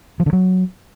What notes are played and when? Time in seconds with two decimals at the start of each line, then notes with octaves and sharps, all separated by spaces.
0.20 F3
0.26 D3
0.33 F#3